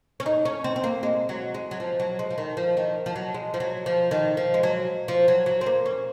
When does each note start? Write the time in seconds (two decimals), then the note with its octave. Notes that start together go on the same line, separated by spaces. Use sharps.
0.20 C#4
0.26 D#4
0.45 C#4
0.64 C4
0.76 C4
0.84 A#3
1.03 G#3
1.29 F#3
1.54 G#3
1.71 F#3
1.80 F3
2.00 F#3
2.19 G#3
2.30 F3
2.38 D#3
2.57 F3
2.77 D#3
3.06 F3
3.16 F#3
3.34 G#3
3.54 F3
3.60 F#3
3.86 F3
4.11 D#3
4.37 F3
4.54 G#3
4.63 F#3
5.08 F3
5.28 F#3
5.46 F#3
5.61 C4
5.66 A#3
5.86 C#4